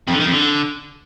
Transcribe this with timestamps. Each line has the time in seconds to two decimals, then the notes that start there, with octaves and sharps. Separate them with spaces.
0.07 F2
0.14 D3
0.20 D#3
0.26 F2
0.32 D3